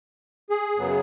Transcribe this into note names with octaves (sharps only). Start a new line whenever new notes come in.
G#4
F#2 C#3 F#3 B3